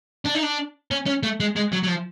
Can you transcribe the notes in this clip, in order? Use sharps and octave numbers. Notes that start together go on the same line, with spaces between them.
D4
D#4
D4
C#4
C#4
A3
G#3
G#3
F#3
F#3
F3